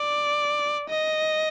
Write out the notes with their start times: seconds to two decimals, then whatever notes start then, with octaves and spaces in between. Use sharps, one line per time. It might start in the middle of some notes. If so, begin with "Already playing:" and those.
Already playing: D5
0.89 D#5